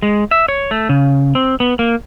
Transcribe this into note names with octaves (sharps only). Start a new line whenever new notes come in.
G#3
E5
C#5
A3
C#3
C4
B3
A#3